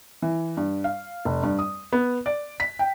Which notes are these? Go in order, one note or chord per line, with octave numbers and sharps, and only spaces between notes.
E3
G2
F5
F1
G2
D#6
B3
D5
B6
G5